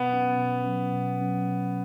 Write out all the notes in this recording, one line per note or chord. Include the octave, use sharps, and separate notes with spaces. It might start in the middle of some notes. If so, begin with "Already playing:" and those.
Already playing: B2 B3
F#3 C#4
B2
F#3 C#4
B2
F#3 C#4
B2